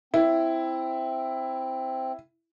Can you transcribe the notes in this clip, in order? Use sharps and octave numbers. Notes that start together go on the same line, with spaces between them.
C4 E4